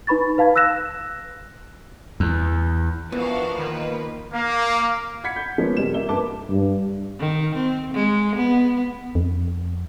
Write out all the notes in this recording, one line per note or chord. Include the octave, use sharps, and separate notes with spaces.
D#4 B4 B5 C#6 A6
B4 F5 A5 G#6
E6 F#6 A#6 E7
E2
E3 F3 B3 D4 F#4 A#4 F5
D#3 A#3 B4
A#3
F#5 B5 G#6 B6 C#7
G6
F3 G#3 A#3 B3 C#4
F#2 C3 G3 E7
A#3 E5 G7
G2 B4 A5 D6
G2
D#3
C4
G#3
B3
F2